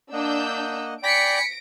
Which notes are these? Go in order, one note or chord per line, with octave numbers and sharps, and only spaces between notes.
A#3 D4 D#5 F#5 E6 G6
D5 G5 G#5 B5 A#6 B6 C#7 D7